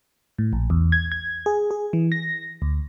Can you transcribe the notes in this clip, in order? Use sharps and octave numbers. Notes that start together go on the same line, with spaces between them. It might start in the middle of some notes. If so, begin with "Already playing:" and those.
A2
A#1
E2
G#6
G#6
G#4
G#4
E3
A#6
D2